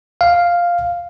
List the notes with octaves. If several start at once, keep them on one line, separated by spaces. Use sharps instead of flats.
F5